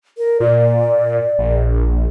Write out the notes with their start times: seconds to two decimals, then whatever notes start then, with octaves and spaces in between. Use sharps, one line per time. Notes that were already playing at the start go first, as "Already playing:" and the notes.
0.18 A#4
0.40 A#2 D5
1.39 A#1